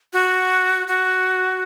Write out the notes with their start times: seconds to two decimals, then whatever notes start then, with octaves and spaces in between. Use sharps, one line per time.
0.13 F#4
0.88 F#4